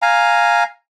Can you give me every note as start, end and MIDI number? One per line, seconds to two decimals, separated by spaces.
0.02 0.64 77
0.02 0.64 80
0.02 0.64 82